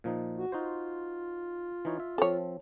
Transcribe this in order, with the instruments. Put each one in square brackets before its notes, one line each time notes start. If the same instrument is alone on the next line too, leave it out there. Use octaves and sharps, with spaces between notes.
[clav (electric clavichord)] A#2 F3 D#4
[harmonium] F#4
[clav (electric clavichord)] D#4 F#4 C5 [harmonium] F4
[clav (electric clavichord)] E3 D#4 C#5
E5
[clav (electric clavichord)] F3 C4 [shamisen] A4 C#5